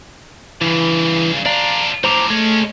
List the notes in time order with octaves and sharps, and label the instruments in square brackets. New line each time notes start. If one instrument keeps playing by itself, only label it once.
[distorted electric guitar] G2 C#3 [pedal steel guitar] E3
[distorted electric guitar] D4 F4 [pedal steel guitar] D5 F5 A#5
[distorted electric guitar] A2 F3 [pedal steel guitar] C5 A#5 D6
[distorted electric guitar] G#3 C#4 [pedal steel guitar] A3